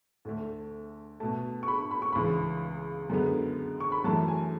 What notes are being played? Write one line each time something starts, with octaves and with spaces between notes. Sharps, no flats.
D2 D3 A3
B2 A3 A5
C#6
B5
B5
C#6
C#2 C#3 E3 B5
F#2 D3 G#3 B3
C#6
B5
F#2 E3 A3 A5
G#5